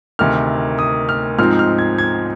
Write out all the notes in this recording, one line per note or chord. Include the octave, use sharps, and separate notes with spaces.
D2 C3 D#3 F6
D#6
F6
G#2 F3 C4 D#4 F6
F6
G#6
G#6